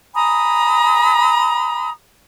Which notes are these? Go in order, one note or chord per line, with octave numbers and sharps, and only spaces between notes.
G#5 A#5 B5 D#6